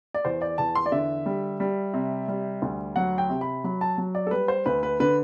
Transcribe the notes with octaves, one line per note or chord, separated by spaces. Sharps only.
D5
E2 C5
D5
E2 A5
C6
D5
D3 E5
G3
G3
C3
G3
D2
F#3 F#5
G5
C3
B5
F#3 B5
A5
F#3
D5
A4
G3 B4
C5
D2 B4
B4
D3 B4